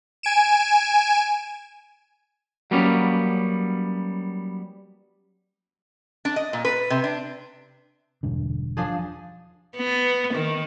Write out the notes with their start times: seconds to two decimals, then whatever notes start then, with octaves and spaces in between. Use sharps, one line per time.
0.23 G#5 D7 E7
2.71 F#3 G3 A#3 B3 C#4
6.25 D4
6.36 D#5
6.53 A#2
6.65 B4
6.90 C3
7.04 D4
8.23 E1 G2 D3
8.77 F3 D4 G#4
9.77 B3
10.35 D#3